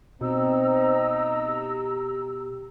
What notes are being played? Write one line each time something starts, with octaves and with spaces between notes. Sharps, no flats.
B2 C4 D#4 A#5 E6
G4